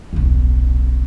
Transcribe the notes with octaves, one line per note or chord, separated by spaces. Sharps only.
D#1 B1